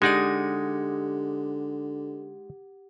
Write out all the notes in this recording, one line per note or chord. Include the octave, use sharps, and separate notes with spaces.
D3 G#3 D#4 G4 D5 F#5 G#6